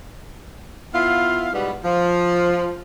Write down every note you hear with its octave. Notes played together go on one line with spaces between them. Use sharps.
B3 E4 F4 F5
G#2 B2 G3 B3
F3